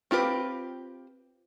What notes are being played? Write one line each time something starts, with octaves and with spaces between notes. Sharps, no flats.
C4 F4 G4 B4